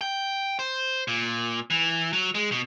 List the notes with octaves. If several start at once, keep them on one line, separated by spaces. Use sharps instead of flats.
G5
C5
A#2
E3
F#3
G#3
B2